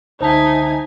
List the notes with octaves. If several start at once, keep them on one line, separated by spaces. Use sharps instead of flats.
C#2 D3 D#4 C5 E5 G#5 A5 B6